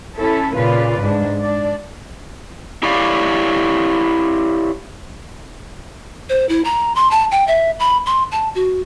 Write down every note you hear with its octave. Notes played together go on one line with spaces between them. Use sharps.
C#4 E4 A4
A#2 C#3 F4 B4 D5
G#2 D4
D4 D5
E4 G4 C#5 D5 F5
C5
E4
A#5
C6
A5
G5
E5
B5
C6
A5
F#4